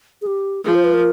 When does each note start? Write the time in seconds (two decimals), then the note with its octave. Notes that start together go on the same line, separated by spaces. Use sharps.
0.22 G#4
0.27 G4
0.64 F3 G#4
0.75 C5
0.84 B4
0.94 A#4